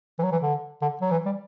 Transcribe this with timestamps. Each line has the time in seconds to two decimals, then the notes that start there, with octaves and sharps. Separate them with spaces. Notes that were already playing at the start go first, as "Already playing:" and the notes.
0.19 E3
0.23 F#3
0.32 E3
0.42 D3
0.82 D3
1.01 F#3
1.11 E3
1.25 G3